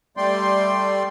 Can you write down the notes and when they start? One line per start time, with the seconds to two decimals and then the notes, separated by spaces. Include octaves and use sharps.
0.17 G3 A3 D5 G5 C6